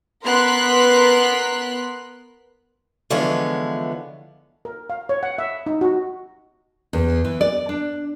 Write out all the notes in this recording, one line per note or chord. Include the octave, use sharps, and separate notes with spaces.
B3 A#4 C6 F#6 B6
D3 E3 F3 G#3 B3 C#5
A#4
F5
C#5
F#5
E5
D#4
F#4
E2
E3
D5
D4